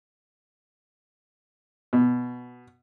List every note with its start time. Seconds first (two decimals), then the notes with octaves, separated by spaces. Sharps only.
1.93 B2